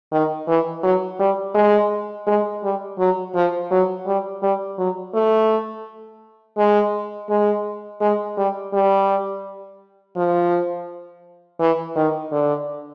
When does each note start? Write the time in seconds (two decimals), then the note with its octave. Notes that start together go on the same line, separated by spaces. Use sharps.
0.12 D#3
0.48 E3
0.83 F#3
1.19 G3
1.55 G#3
2.27 G#3
2.63 G3
2.99 F#3
3.34 F3
3.71 F#3
4.06 G3
4.42 G3
4.78 F#3
5.14 A3
6.58 G#3
7.29 G#3
8.01 G#3
8.37 G3
8.73 G3
10.16 F3
11.60 E3
11.96 D#3
12.32 D3